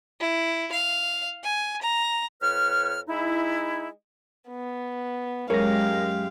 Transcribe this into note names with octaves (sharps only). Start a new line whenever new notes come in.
E4
F5
G#5
A#5
F2 B4 C#5 F6
G#3 D#4 E4
B3
F#2 G#3 G4 G#4 A#4 C#5 F5 A#6